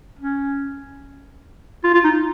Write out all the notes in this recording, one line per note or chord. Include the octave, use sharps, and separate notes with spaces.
C#4
F4
F4
D#4